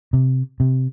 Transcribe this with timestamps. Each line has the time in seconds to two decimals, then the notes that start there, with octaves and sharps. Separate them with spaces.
0.13 C3
0.60 C3